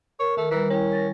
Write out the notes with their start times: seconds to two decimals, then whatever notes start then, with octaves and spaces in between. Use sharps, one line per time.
0.20 A#4 C#5
0.37 D#3 A3
0.51 E3 G3 A#5
0.70 C#4 E4 G5
0.92 A6 A#6